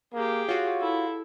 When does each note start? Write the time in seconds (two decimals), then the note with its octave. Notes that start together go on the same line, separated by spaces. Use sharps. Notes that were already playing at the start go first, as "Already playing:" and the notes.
0.13 A#3 G4 G#4
0.49 F4 F#4 C#5
0.80 E4 A4